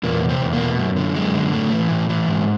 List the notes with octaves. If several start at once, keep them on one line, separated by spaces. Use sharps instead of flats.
E2 A#2 A#3
B2
C3 C4
E2
A#2 A#3
B2
F#2
D3
F#2 G#3
D3
A2 A3
E3
A2
E3
G#2